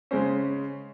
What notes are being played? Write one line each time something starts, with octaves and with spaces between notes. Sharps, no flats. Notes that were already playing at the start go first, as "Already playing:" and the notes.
C#3 G#3 C#4 C5